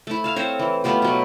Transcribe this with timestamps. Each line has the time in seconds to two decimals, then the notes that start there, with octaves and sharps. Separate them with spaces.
0.07 A3 E4
0.24 F5 A5
0.36 C4 A4 C5 C#5
0.59 E3
0.84 A3 B3 F4 G4
1.02 B2 F#3